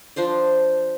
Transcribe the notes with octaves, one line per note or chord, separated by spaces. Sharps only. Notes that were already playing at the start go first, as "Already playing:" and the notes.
F3 D4 C5 D5